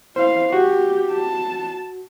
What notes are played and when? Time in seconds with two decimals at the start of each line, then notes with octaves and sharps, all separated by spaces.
0.16 E4 C5 F5
0.53 F#4 G4
1.11 A5